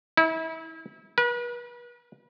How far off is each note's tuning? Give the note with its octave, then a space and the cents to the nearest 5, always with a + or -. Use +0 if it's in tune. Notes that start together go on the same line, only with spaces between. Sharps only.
E4 -35
B4 -40